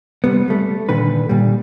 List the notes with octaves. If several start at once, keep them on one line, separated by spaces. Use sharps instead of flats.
C3 G3 B3
G3 A3
A#2 D3 D#3 B4
A#2 G3